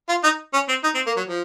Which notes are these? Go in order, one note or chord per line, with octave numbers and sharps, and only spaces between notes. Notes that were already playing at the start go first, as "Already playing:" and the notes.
F4
D#4
C#4
C4
D#4
C4
A#3
F#3
F3